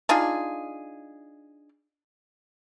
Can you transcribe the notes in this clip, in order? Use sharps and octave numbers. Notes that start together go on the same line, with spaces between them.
D4 D#4 F4 G#4